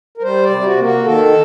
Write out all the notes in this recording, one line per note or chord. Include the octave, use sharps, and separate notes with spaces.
A#4
G3 C5
D5
C3
F#4
A#3
F#4
D#3 A4